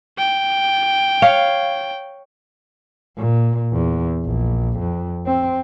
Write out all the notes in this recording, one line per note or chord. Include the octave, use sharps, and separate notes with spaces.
G5
C#5 F5
A#2
E2
A#1
F2
C4